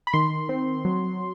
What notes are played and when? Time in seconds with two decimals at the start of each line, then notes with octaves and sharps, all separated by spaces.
0.07 B5
0.13 D#3 C6
0.49 C4
0.85 F#3